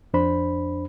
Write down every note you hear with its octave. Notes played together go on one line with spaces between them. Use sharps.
F2 D4 C5 B5